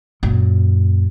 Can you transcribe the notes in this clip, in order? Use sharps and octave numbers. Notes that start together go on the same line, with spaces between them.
F#2 A#2